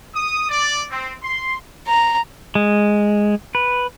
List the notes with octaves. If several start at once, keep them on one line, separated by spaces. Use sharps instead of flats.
D#6
D5
C4
C6
A#5
G#3
B4